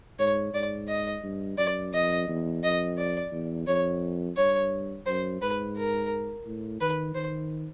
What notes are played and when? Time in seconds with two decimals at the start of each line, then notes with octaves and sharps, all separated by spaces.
0.19 G#2 C#5
0.54 G#2 D5
0.88 D#5
1.23 G2
1.58 F#2 D5
1.93 F2 D#5
2.28 E2
2.63 F2 D#5
2.98 D5
3.32 E2
3.67 F2 C#5
4.37 G2 C#5
5.06 F#2 C5
5.42 G#2 B4
5.77 A#4
6.46 A2
6.81 D#3 B4
7.15 D#3 C5